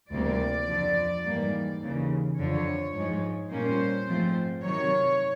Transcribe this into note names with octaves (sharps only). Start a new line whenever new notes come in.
D2 C3 E3 G3 A#3 D5
F2 D3 F3
G#2 E3 G3 A#3
D#2 C#3 E3
F2 D3 F3 C#5
G#2 F3 G#3
A#2 G3 A#3 C#4 C5
G#2 F3 A3 C4
C3 D#3 F#3 C#5